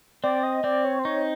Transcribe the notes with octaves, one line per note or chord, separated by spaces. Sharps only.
C4 D5
D#5
C4 D5
C#5
C5
D#4 C#5